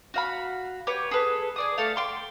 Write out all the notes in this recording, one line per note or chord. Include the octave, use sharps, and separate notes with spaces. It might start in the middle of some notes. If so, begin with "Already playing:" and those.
F#4 F5 B5
G4 B4 C#5
G#4 A4 B4
G#4 D5 D#6
A3 A4 F5
G5 C6 D6